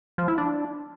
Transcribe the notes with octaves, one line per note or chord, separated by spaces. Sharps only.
F3
E4
D4